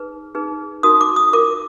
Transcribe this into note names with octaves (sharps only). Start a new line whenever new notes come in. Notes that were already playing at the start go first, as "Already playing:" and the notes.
Already playing: D#4 G#4 B4
D#4 G#4 B4
D#4 F#4 A#4 D#6
D6
D#6
F4 A#4 D6